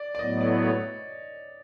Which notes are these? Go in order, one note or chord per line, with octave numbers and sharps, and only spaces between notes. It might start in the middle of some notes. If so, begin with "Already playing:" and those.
Already playing: D5
D5
A2 F#3 B3 D#5
D5
C#5